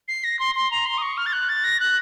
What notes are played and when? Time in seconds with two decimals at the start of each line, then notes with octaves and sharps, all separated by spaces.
0.08 C7
0.24 A#6
0.39 C6
0.55 C6
0.71 A#5
0.86 C6
0.98 D#6
1.02 C#6
1.17 F6
1.26 A6
1.33 F#6
1.49 A6
1.64 A#6
1.80 F#6